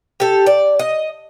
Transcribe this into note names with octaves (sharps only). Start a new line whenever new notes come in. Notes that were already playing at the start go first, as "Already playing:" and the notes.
G4 A4
D5
D#5